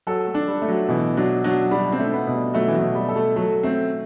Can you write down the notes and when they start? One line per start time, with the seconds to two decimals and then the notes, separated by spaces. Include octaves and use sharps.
0.07 F#3 A4
0.27 A3
0.34 D4
0.48 G3
0.62 A3
0.68 F#3
0.89 B2 E3
1.17 F#3 D4
1.44 F#3 D4
1.71 G3 D4
1.92 C4
1.99 A3
2.08 C4
2.13 B3
2.27 B2
2.34 G3
2.54 F#3 A3
2.68 E3
2.75 F#3
2.81 B2
2.95 G3
3.09 A4
3.16 A3
3.36 F#3 A3
3.63 A3 C4